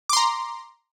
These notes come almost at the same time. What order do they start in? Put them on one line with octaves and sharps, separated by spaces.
D6 C6 A#5